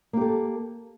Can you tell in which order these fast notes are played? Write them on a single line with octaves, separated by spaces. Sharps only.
A#3 G4 A4